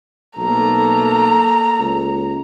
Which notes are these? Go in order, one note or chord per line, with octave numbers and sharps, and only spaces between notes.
B1 A3 A#3 A#5
C#2